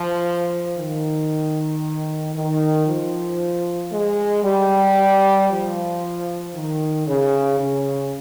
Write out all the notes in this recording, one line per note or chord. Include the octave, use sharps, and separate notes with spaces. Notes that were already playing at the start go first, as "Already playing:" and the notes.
Already playing: F3
D#3
D#3
F3
G#3
G3
F3
D#3
C#3
C#3